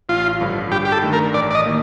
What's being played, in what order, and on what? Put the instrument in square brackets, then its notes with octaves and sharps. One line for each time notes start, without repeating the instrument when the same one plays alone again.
[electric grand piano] A1 [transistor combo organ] F4
[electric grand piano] G2 D3 F3
[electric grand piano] G2 [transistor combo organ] G4
[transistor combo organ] G4
A4
[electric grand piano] D#3 A3 D4
[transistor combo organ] A#4
[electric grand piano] A1 [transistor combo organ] D5
[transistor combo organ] D5
D#5
[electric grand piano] D#3 A#3